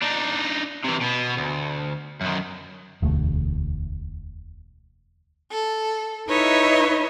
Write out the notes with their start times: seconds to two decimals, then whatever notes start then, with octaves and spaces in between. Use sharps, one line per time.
0.02 D4 D#4
0.84 C3 E3
1.01 B2 B3
1.37 D2
2.21 F#2 D#3
3.02 E1 D2 A3
5.52 A4
6.29 D#4 E4 B4 C#5 D#5 E5